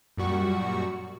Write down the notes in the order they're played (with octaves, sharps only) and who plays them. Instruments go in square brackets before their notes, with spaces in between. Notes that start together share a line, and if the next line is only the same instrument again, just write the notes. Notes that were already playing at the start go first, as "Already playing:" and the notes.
[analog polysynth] F#2 A#2 G3 F#4 C#6